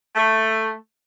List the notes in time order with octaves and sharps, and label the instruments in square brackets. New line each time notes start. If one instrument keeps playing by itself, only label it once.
[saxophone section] A3